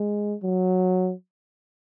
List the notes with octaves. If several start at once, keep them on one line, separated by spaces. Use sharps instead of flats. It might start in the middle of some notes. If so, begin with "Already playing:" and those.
Already playing: G#3
F#3